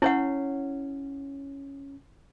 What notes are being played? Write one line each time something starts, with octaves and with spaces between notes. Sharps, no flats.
C#4 E4 C#5 F#5